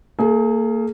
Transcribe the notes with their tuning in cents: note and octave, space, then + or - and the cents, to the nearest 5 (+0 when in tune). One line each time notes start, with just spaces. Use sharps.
A#3 -30 G#4 +30